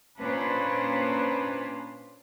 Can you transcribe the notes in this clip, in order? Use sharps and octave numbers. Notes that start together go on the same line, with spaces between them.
A#2 C#4 D4 B4 C5